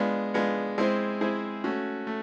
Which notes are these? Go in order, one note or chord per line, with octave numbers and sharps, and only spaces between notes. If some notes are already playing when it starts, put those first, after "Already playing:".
Already playing: G#3 B3 D4 F4
G#3 B3 D4 F4
G#3 C4 E4 G#4 C5
G#3 C4 E4 G#4 C5
A3 C#4 F#4
A3